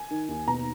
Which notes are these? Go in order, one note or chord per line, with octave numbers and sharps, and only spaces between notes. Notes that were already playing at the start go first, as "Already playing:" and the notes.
Already playing: G#5
D#3
D#2
B2 A#5